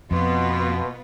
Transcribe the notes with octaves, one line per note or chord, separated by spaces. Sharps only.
F2 B2 B3 F4 B4 C6